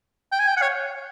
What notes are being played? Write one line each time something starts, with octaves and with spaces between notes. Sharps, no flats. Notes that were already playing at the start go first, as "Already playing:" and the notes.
G5
G#5
G5
F#5
C#5